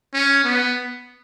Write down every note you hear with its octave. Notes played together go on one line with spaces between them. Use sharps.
C#4
B3